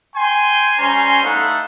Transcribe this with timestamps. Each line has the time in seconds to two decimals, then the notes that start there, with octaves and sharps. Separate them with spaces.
0.16 G5 G#5 C6
0.79 G3 C#4 C5 G#5 A#5 C6
1.23 A3 D#4 E4 A4 F5 F#5